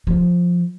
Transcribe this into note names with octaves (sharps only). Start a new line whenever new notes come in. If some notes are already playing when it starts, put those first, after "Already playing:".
F3